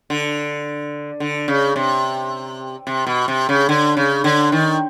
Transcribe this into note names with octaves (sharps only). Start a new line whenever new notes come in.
D3
D3
C#3
C3
C3
B2
C3
C#3
D3
C#3
D3
D#3